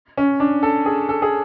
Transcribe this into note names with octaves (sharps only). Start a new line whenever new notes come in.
C#4
D4
A4
G#4
A4
G#4